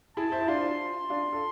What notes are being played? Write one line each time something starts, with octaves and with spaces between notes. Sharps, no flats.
E4 G#4 A5
C5 E5
E4
D4 F4 C6
D4 F4
A4